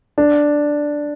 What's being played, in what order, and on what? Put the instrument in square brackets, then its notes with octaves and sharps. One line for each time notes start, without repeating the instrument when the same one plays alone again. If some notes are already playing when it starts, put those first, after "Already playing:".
[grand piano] D4